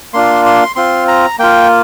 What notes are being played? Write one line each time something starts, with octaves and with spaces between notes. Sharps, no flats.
A#3 D4 F4 C6
C6
C4 F4 C6
A#5
A#3 F4 G5